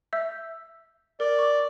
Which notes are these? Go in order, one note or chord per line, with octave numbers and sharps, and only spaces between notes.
E5 E6 G6
A#4 D5
C#6 D6